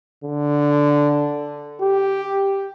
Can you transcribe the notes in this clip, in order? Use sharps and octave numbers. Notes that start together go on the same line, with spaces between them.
D3
G4